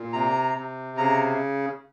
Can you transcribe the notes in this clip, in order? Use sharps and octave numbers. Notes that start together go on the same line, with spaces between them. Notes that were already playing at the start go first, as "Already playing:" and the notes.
Already playing: A#2
C3 A#5
C3
C#3 A#5